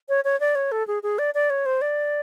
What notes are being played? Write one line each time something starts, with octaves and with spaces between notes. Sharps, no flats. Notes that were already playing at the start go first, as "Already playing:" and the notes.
C#5
C#5
D5
C#5
A4
G#4
G#4
D5
D5
C#5
C5
D5